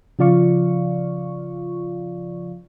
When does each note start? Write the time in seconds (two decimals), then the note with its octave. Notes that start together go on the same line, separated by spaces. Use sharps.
0.19 C#3 F3 F4 D5 F5 C#6